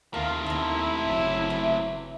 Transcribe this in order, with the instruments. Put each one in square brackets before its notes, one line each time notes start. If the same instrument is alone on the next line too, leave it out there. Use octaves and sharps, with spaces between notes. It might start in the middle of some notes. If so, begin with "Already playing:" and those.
[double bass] D#2 [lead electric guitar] C3 A3 [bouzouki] F3 [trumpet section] F4 A#4 F5
[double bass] D#2 [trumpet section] E4 [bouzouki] A5 A#5
[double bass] F#1 F#3
[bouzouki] E3